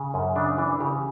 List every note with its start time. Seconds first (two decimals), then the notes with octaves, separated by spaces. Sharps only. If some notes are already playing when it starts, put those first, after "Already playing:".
Already playing: C#3
0.14 F#2
0.36 C#3 D4
0.58 E3 D4
0.80 C#3 G4